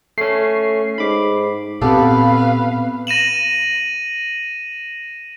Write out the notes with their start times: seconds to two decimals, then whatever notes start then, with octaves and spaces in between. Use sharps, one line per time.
0.18 A3 C#4 C7
0.98 G#2 B5 D6
1.81 A#2 B3 C4 G4 A4 B4 F5
3.07 A#6 D#7 E7 F#7